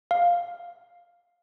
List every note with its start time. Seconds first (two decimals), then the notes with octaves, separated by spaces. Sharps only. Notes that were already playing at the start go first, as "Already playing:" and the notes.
0.11 F5